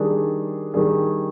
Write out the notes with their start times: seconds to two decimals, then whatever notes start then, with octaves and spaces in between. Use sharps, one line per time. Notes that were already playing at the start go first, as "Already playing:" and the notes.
Already playing: D#3 G3 D4 G#4
0.74 D#3 G3 D4 G#4